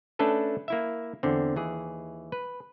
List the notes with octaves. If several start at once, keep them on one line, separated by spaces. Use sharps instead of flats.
A3 C#4 D4 A4 B4
A#3 E4 E5
E2 D3 C4
D#2 E3 G#4
B4